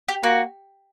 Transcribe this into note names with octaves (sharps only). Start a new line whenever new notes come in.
G4
A#3 F#4